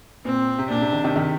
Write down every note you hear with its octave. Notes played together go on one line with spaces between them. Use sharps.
A#2 C4
C3
A#2 D4
C3
C3 D#3
C3 D#3
C3 D#3